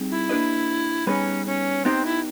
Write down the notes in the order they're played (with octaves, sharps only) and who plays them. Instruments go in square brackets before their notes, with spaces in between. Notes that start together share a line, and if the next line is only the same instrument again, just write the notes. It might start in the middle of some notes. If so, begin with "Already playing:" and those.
Already playing: [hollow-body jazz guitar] G3 C4 D#4 G#4
[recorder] E4
[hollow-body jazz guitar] A#3 D4 G4 B4 D#5
[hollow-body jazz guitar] G3 B3 D#4 G#4 B4 [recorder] C#4
[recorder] C#4
[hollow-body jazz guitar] B3 D#4 G4 [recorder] C4
[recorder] E4